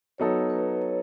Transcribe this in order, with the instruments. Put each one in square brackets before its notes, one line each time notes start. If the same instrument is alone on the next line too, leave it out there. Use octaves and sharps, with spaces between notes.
[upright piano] F#3 B3 D#4 A4 [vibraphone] C#5
[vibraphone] B4
C#5